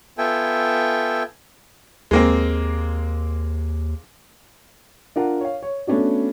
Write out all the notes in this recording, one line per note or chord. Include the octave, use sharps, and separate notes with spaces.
B3 F4 A4 E5 G5 G#5
D#2 G#3 A#3 C4
D4 F4 A#4 F#5
C#5 F5
C#5
A3 B3 C#4 D4 F#4